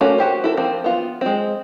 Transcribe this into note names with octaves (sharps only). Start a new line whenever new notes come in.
A3 A#3 C#4 F#4
F#4 G4 C5
E4 A4 A#4
F3 A#3 C4
B3 F4
G#3 C4